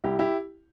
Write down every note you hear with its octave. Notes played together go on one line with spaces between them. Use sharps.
C2 E4 G4
E4 G4